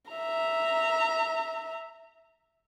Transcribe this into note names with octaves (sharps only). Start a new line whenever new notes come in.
E5 A#5